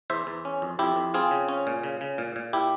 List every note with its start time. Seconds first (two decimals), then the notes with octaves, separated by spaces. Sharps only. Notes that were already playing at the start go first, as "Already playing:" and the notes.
0.10 E2 C5 E5
0.27 E2
0.45 C#4
0.62 F2
0.79 F2 E4 G4
0.96 F2
1.14 C4 F4 G#4
1.31 C#3
1.49 C#4
1.67 A#2
1.83 C#3
2.01 C#3
2.18 A#2
2.36 A#2
2.53 E4 G4